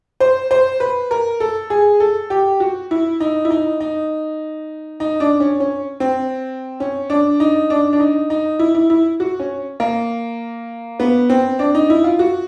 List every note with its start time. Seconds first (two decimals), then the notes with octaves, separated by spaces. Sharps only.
0.20 C5
0.51 C5
0.80 B4
1.11 A#4
1.40 A4
1.70 G#4
2.00 A4
2.30 G4
2.60 F#4
2.91 E4
3.20 D#4
3.45 E4
3.50 D#4
3.80 D#4
5.00 D#4
5.20 D4
5.40 C#4
5.60 C#4
6.00 C4
6.80 C#4
7.10 D4
7.40 D#4
7.70 D4
7.93 D4
8.00 D#4
8.30 D#4
8.59 E4
8.75 E4
8.90 E4
9.20 F#4
9.39 C#4
9.80 A#3
11.00 B3
11.29 C4
11.59 D4
11.75 D#4
11.90 E4
12.04 F4
12.19 F#4